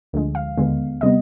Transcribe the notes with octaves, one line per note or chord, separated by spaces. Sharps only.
D2 D3 F3 G#3
F5
D#2 D3 G#3 B3
C3 G3 B3 D#5